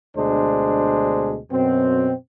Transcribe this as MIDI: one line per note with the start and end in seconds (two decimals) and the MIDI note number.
0.17 1.38 38
0.17 1.38 47
0.17 1.38 56
0.17 1.38 62
0.17 1.38 72
1.52 2.13 42
1.52 2.13 47
1.52 2.13 60